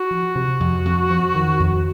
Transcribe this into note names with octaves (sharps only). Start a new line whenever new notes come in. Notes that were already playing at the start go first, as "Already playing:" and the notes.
Already playing: F#4
F3
C3
F2
F2
F3
D#3
F2